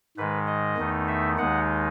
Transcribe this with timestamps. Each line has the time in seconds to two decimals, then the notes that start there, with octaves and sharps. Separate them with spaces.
0.17 G#2 D#3 G#3 B4
0.47 D#5
0.78 E2 D#3 A3 D#4
1.08 E5
1.38 D#2 D#3 G#3 D#4 F#5